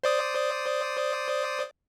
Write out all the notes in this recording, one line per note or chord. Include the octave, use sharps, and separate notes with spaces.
C5 D5 D#6